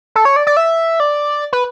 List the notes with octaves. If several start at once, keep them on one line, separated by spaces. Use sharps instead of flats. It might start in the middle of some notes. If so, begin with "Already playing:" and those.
A4
C#5
D5
D5
E5
D5
B4